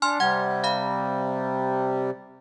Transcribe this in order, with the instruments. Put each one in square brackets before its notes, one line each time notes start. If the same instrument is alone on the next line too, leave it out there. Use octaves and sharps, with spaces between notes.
[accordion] D4 [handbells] G#5 C6 F6
[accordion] C3 G3 [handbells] F#5 G#6
[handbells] F5 B5